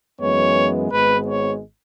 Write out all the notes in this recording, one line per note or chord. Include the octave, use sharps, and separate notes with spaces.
F#2 E3 G#3 B3 C#5
G#1 G#2 G#3 B3 B4
C#5